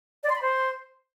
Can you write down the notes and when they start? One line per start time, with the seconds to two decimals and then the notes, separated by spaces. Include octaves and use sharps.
0.23 D5
0.29 C6
0.35 B5
0.41 C5